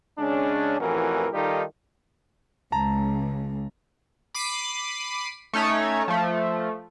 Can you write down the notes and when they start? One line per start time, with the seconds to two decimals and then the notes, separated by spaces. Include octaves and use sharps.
0.19 C#3 G#3 C#4 D4
0.80 A1 F2 E3 C#4 F#4 A#4
1.34 D#3 G3 D#4 F4 G4 A4
2.72 C#2 A5 A#5
4.34 B5 D6 B6 C7 D#7
5.53 A3 C#4 D#4 C#5
6.08 F3 A3